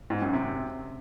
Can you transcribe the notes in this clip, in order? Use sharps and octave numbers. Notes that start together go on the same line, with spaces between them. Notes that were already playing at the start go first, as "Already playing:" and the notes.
G#2
F#2
C3